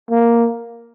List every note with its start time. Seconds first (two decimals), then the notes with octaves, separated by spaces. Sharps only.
0.11 A#3